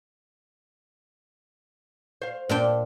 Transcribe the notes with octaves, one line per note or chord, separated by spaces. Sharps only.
C5 F5
A#2 G3 D4 G5